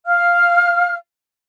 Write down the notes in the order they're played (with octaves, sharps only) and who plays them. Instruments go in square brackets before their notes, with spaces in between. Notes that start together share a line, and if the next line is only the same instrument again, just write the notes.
[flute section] F5 F6